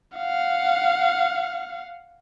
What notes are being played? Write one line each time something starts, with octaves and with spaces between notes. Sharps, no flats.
F5 F#5